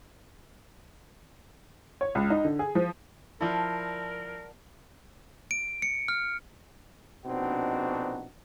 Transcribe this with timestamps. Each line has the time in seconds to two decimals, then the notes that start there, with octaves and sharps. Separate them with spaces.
2.01 C#5
2.15 C#2
2.30 D#4
2.45 D3
2.59 G#4
2.75 F3
3.41 F3 E4 A#4 D5 F#5 A5
5.51 D7
5.82 C#7
6.08 F6
7.26 A#1 B2 C4 D4 D#4 F#4